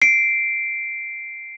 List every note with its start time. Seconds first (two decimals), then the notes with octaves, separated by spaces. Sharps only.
0.02 C7 D7